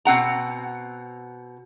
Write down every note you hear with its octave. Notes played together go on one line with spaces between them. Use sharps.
B2 C4 F#5 A#5